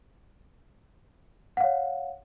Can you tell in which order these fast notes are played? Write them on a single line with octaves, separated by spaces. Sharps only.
F#5 F5 C#5